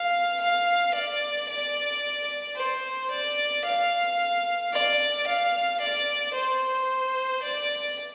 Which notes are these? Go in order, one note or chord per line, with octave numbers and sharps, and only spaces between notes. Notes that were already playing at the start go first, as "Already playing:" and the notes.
Already playing: F5
F5
D5
D5
C5
D5
F5
D5
F5
D5
C5
D5